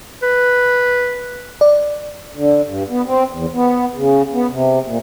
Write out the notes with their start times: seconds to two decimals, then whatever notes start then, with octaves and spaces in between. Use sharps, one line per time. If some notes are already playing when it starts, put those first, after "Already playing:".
0.23 B4
1.61 D5
2.35 D3
2.65 G2
2.90 B3
3.06 C4
3.32 E2
3.53 B3
3.95 C#3
4.34 B3
4.51 C3
4.85 A#2